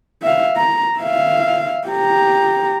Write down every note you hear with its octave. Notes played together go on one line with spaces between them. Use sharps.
E5 F5
A#5
E5 F5
G4 A#5